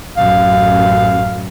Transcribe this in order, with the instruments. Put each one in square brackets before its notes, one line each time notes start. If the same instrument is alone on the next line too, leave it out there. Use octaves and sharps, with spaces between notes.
[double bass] A1 F#2 [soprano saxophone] F5